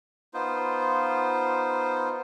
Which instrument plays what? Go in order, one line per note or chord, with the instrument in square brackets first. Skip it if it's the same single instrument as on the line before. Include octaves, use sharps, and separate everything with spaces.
[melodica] B3 D#4 F4 C5